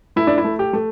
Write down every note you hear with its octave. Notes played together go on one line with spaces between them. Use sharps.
A3 E4
D4
E4
A3
G4
A3